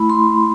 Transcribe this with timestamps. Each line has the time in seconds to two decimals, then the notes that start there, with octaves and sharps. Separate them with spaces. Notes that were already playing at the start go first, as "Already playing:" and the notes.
Already playing: A3 E4 B5
0.10 C6